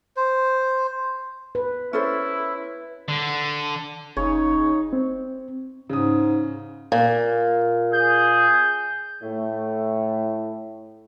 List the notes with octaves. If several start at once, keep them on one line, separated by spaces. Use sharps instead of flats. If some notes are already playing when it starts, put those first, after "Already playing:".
C5
B4
C#4 E4 A4 C5
D3
F#1 C#3 D#4 C#5
C4
G#2 C#3 D#6
A#2
G#4 G6
A2 A3